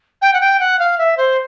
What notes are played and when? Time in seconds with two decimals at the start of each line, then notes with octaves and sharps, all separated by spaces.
0.22 G5
0.34 F#5
0.41 G5
0.60 F#5
0.79 F5
0.98 E5
1.17 C5